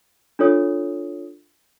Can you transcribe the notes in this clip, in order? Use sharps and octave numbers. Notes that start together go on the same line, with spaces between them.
D4 F4 A4 C#5 D#6